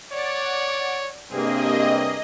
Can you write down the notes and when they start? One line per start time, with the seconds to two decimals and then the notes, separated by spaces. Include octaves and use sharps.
0.13 C#5 D5 F#5
1.31 G2 C3 A#3 C4 G#4 D#5